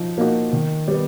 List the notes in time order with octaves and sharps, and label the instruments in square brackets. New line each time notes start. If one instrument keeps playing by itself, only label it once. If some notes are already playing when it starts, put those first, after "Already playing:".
Already playing: [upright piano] F3 D#4
A#3 D#4 F#4
D#3
G3 B3